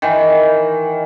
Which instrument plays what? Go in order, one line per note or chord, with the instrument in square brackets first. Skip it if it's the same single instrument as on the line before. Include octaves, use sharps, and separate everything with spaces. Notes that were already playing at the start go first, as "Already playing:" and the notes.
[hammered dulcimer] D#3 E3